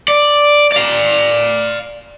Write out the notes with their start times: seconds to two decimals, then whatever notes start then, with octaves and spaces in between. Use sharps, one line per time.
0.08 D5
0.72 D5 F5